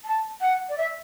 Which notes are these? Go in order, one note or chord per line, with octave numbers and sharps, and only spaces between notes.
A5
F#5
D5
E5